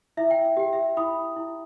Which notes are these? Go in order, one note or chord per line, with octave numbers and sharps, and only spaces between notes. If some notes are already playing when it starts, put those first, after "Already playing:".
E4 E5
G5
E5
G4 G5
E5
E4 B5 D#6
E4